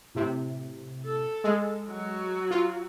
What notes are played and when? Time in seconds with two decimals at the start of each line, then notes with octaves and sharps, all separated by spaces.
0.15 A2 C3
1.05 A4
1.44 G#3
1.88 F#3 F#4
2.51 F4